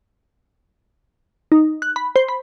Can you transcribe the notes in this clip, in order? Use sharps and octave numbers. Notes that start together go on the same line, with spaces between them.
D#4
F#6
B5
C5
B5